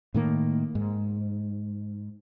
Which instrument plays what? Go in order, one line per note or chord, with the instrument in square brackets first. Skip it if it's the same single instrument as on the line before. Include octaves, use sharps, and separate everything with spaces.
[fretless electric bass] A2 D#3 A#3
G#2